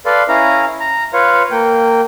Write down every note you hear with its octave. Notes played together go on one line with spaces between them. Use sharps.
A4 B4 D5 F5 C6
C#4 E4 F5 A#5
A#5
F4 B4 C#5 F5
A#3 G5